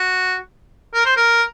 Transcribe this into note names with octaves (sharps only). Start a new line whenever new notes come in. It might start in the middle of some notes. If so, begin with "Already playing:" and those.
Already playing: F#4
A#4
C5
A#4